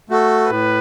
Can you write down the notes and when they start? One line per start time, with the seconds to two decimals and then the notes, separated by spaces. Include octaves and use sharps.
0.09 A3 F#4 A4
0.50 A2 B4